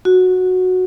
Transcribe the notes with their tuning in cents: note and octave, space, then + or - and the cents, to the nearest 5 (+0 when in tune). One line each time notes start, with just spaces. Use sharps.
F#4 -10